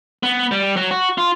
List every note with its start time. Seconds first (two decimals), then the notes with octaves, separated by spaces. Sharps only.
0.23 B3
0.52 G3
0.77 F#3
0.91 F#4
1.18 F4